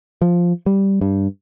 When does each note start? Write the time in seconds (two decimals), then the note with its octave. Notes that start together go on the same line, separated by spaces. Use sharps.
0.22 F3
0.66 G3
1.01 G2